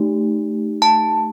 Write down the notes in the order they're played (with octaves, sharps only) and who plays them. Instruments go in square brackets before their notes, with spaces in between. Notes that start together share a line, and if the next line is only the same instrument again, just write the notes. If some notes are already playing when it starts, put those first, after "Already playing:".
Already playing: [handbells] A3 D#4 G4
A5